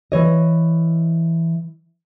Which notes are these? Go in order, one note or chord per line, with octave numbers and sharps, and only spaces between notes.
E3 C#5 D#5